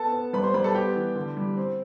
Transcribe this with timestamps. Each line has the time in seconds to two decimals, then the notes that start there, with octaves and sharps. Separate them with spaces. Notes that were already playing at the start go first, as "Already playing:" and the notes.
Already playing: B3 A4 A5
0.12 B3
0.33 G3 B4 B5
0.43 C5 C6
0.54 G3 B4 B5
0.64 A4 A5
0.75 B3 G4 G5
0.96 E3
1.15 D3
1.37 G3
1.57 C4